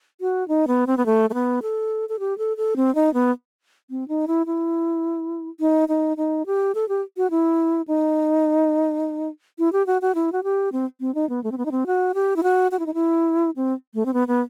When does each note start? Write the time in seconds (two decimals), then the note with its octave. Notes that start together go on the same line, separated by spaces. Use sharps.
0.21 F#4
0.48 D#4
0.67 B3
0.87 C4
0.97 B3
1.06 A3
1.30 A3
1.34 B3
1.62 A4
2.09 A4
2.19 G4
2.38 A4
2.57 A4
2.76 C4
2.95 D#4
3.14 B3
3.90 C4
4.08 D#4
4.28 E4
4.46 E4
5.60 D#4
5.89 D#4
6.17 D#4
6.46 G4
6.75 A4
6.89 G4
7.17 F#4
7.31 E4
7.88 D#4
9.59 E4
9.73 G4
9.87 F#4
10.02 F#4
10.15 E4
10.32 F#4
10.44 G4
10.73 C4
11.00 C4
11.15 D#4
11.29 B3
11.44 A3
11.52 C4
11.58 B3
11.66 D#4
11.72 C4
11.86 F#4
12.14 G4
12.36 E4
12.43 F#4
12.71 F#4
12.79 E4
12.86 D#4
12.94 E4
13.56 C4
13.94 A3
14.06 C4
14.14 B3
14.28 B3